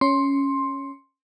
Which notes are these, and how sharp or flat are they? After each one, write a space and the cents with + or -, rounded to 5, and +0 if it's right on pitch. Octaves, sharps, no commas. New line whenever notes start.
C#4 +0 C6 +10